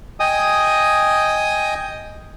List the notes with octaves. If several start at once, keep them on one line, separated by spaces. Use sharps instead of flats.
D#5 G5 G#5 D#6